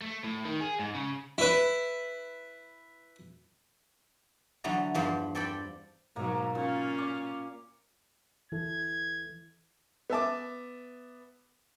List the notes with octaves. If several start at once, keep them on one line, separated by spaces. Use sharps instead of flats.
A3
A2
D#3
G#4
G#2
C#3
E4 B4
D3 E3 F#3 B3 E5 A#5
E2 G2 F3 C5 B5
C4 A4 D5 G5 B5
G#2 B2 F#3 A#3 A#5
A#2 C#4 F4
D6
D2 E3 E4 A4 G#6
B3 E5 A5 D6